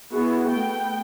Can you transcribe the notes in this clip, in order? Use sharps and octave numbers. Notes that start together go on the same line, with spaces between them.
B3 E4 F#4 G#4
A3 B3 G5